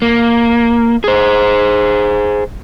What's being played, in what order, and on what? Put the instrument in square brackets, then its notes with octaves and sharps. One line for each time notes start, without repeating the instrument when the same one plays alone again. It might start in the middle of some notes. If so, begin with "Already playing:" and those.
[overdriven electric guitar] A#3
G#4 C5